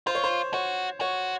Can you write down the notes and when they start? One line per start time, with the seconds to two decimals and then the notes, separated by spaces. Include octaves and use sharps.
0.07 F4 C5
0.15 C#5
0.24 C5
0.53 F#4 C#5
1.01 F#4 C#5